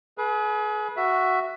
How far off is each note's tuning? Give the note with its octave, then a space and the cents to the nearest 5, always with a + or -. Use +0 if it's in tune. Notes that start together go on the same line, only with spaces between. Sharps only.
G#4 +35 B4 -20
F#4 +0 E5 +10